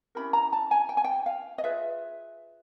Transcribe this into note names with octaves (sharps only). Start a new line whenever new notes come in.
C#4 E4 G4 A#4 B5
A#5
A5
G#5
G5
G#5
G5
F5
D#5
F4 G#4 B4 E5